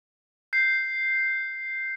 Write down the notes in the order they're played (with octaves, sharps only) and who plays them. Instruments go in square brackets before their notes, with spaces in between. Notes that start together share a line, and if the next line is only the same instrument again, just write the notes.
[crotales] G6 C7